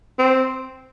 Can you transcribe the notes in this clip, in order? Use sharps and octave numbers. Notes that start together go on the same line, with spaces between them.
C4